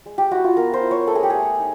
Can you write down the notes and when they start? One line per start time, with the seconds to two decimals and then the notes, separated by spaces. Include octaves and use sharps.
0.06 G#3
0.18 G4
0.31 E4 F#4
0.44 F4
0.57 B3 A#4
0.73 C5
0.83 E4
0.91 C#5
1.07 A3 A4
1.15 G#4
1.23 G4
1.30 A3 G#4
1.59 D#4